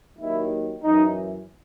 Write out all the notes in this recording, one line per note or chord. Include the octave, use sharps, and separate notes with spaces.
D#2 D#3 F#3 E4
F#2 E3 D#4